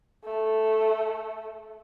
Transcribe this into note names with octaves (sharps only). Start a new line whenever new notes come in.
A3